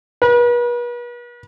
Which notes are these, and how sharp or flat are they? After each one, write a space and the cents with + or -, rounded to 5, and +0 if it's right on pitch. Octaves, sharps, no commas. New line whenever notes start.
B4 -40